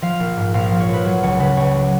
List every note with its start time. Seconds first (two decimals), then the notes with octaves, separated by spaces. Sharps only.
0.02 F3 F5
0.20 A#1
0.37 G#2
0.54 A#1 F5
0.66 F3 F5
0.80 C#5
0.89 A#1 B4
1.05 F#3 C#5
1.23 C#2 C#5
1.39 C#3 B4
1.57 C#2 C#5
1.75 F#3